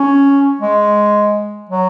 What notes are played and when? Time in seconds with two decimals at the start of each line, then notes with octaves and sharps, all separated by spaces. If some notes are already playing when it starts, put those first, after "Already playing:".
Already playing: C#4
0.61 G#3
1.69 F#3